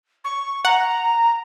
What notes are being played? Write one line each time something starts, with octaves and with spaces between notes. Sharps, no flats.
C#6
F#5 A#5